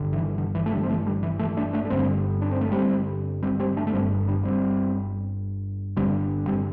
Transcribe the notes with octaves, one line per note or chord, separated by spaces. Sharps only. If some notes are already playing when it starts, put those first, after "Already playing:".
Already playing: G1 D3
E3
D3
E3
A3
D3 G3
C4
E3 A3
D3 G3
E3
E3 A3
A3 D4
A3 D4
A3
G1 G2 D3 G3 C4
D4
C4
A3
G3 C4
G3 C4
G3 C4
A3 D4
A3
G1 G2 D3 G3 C4
D3 G3
G3 C4
G1 G2 D3 G3 C4
G3 C4